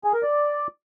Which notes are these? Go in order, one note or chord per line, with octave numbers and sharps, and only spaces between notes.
G#4
A#4
D5